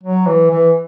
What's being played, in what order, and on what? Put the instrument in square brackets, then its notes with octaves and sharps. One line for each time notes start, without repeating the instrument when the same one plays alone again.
[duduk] F#3
E3
E3